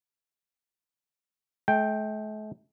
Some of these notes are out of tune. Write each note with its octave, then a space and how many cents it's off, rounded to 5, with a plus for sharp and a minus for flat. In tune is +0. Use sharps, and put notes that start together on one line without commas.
A3 -45 G5 +0